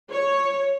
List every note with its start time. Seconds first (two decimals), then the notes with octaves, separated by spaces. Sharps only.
0.11 C#5